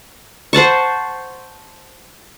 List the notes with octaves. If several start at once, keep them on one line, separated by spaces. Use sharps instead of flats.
C5 F#5 A5 C#6